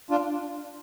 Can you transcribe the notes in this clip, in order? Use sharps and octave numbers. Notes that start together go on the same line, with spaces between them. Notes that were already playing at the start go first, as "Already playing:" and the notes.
D4 F4